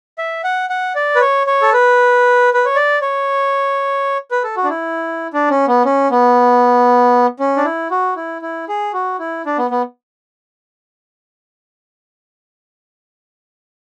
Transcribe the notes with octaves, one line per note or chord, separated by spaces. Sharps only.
E5
F#5
F#5
D5
B4
C#5
C#5
A4
B4
B4
C#5
D5
C#5
B4
A4
F#4
D4
E4
D4
C#4
B3
C#4
B3
C#4
D4
E4
F#4
E4
E4
G#4
F#4
E4
D4
B3
B3